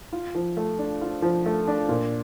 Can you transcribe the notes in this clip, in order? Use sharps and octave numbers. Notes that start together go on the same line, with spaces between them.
F4
F3
A3
D4
F4
F3
A3
D4
A#2